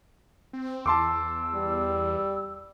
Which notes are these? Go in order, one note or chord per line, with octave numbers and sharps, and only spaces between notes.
C4
E2 A5 C6 D6 E6
G3